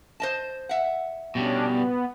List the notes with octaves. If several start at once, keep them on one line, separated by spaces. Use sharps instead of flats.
C5 D#5 A5
E5 F#5
B2 G3 C#4 D4
B3